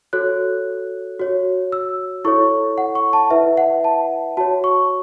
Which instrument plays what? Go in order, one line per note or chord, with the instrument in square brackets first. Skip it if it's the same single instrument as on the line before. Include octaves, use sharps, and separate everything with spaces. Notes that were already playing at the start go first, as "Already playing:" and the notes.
[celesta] F#4 A4 C#5 F#6
F#4 C#5
E6
E4 A4 C#5 C#6
F#5
C#6
A5
E4 B4 E5
F#5
A5
F#4 C#5 A5
C#6